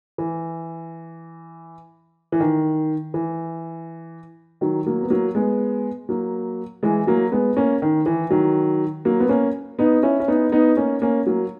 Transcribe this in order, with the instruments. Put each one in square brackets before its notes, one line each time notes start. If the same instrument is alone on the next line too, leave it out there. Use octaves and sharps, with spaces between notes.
[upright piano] E3
E3
D#3
E3
D#3 F#3
F#3 A#3
B3
F#3 A#3
G#3 B3
F#3 A#3
E3 G#3
F#3 A#3
G#3 B3
A#3 C#4
D#3
E3
D#3 F#3
F#3 A#3
B3
A#3 C#4
B3 D#4
C#4 E4
C#4
B3 D#4
B3 D#4
A#3 C#4
A#3 C#4
F#3 A#3